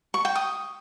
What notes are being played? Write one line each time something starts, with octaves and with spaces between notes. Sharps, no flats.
C#6
G5
D#6